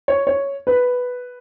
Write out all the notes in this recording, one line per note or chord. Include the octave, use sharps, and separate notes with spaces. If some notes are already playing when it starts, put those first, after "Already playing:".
C#5
C#5
B4